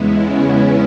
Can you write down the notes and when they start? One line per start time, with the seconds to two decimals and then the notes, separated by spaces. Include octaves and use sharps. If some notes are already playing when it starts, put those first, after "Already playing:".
Already playing: E2 C#3 G#3 B3 C#4 E4
0.33 B3